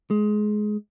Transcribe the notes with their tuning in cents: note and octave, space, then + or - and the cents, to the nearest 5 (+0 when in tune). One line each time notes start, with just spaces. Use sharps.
G#3 +20